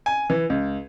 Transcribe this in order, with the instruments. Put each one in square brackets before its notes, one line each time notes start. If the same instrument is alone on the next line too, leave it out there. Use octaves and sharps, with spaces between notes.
[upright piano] G#5
E3
C#2